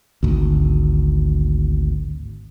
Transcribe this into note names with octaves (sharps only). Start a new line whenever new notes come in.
G#1 D2